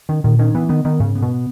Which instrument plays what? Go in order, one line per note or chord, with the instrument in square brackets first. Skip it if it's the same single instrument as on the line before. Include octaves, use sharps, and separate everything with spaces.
[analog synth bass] D#3 [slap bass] C#4
[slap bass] A#2 [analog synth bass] D#3
[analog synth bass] D#3 [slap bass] C#4
[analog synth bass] E3 [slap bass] B3
[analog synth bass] D#3 [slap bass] B3
[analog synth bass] D#3 [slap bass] B3
[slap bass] G#2 [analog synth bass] C#3
[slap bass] B3
[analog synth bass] B2